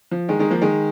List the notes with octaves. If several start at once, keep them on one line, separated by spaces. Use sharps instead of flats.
F3
D#3 G#3
D#3 G#3
F3 A#3
D#3 G#3